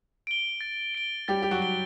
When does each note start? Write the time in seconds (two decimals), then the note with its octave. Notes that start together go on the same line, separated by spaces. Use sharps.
0.27 D7 G7
0.61 A6
0.95 D7 G7
1.28 G3 G4 A6
1.42 G4
1.51 F#3 F#4
1.62 D7 G7